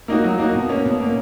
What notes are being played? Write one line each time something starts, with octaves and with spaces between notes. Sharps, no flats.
A#3 D#4 F#4
F#3
A#3 D#4 F#4
B2
A#3 C#4
B2
A#3 C#4